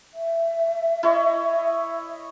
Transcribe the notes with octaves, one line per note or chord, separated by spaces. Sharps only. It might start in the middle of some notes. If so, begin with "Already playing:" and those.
E5
E4 C#5 D#5